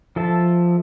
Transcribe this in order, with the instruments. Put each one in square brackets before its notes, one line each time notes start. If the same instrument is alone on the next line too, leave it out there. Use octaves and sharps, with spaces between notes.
[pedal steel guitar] F3 A4 E5 A5